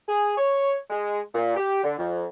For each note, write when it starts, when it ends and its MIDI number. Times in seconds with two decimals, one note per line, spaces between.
0.08 0.34 68
0.38 0.76 73
0.90 1.19 56
1.35 1.54 46
1.56 1.81 67
1.84 1.97 50
1.98 2.26 41